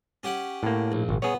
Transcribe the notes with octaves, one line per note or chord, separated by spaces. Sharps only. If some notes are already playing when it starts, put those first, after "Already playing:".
C#4 G4 F#5
A2 A#3
A#1
G#1
B3 G#4 C#5